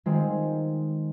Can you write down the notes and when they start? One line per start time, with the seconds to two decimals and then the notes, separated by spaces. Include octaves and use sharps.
0.06 D#3 G#3 C4 F4